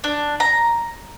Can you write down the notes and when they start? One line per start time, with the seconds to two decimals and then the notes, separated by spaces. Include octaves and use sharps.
0.04 D4
0.40 A#5